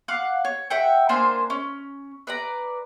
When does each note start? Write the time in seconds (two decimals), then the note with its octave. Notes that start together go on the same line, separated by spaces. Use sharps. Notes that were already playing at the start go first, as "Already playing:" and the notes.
0.08 F5 F#5 D6 F6
0.45 C#5
0.70 E5 F#5 G5
1.09 A#3 D4 C5 G#5
1.50 C#4
2.27 B4 D5 A#5